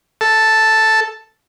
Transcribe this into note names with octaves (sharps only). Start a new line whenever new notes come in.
A4